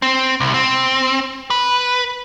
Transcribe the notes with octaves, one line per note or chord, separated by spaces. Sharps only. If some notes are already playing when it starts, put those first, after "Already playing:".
C4
C2
C4
B4